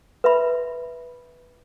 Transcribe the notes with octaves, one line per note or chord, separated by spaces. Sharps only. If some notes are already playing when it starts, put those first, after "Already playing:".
B4 E5 B5